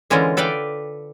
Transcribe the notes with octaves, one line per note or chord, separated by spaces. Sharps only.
D3 E3 G#3 C#4 F4 A#4
A4 B4 D5 F5 G5